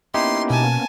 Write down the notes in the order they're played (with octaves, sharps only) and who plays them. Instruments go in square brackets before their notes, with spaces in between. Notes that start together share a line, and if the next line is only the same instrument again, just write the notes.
[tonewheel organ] A#3 B3 C#4 [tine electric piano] D#4 E4 G4 [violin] C6 C7
[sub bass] B2 [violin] G#5 A5